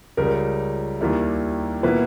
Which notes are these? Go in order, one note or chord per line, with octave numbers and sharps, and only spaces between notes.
C#2 C#3 G3 A#4
D#2 D#3 G3 A#3 E4
B2 A#3 E4 B4